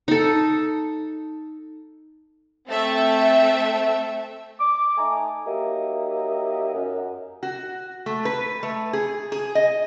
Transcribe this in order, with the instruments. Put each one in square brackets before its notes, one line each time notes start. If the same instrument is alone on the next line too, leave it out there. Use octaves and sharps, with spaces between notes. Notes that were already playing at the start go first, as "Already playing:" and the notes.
[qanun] D#4 A4
[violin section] A3 C4 A4 E5
[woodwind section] D6
A3 D#4 D#5 G#5 A#5
F#3 A#3 D#4 G4 D#5 E5
F#2
[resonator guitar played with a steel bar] F#4
A3
B4
A3
G#4
G#4
D#5